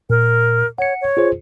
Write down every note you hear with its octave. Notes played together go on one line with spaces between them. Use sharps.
A#2 A#4
C#5 F#5 C#7
C#5
F4 G#4 C5